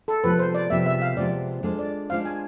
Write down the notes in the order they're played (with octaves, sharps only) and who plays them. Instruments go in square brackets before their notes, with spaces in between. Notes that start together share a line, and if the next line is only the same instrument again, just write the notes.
[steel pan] A4
[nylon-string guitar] C3 F3 G#3 B3 [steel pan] B4
[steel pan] C5
D5
[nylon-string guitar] C3 F3 G#3 B3 [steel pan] E5
[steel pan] E5
F5
[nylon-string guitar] C3 F3 G#3 B3 [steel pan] D5
[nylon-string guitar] G#3 D4 F4 A4 C5
[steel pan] D5
[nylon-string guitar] G#3 D4 F4 A4 C5 [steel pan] F5
[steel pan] G#5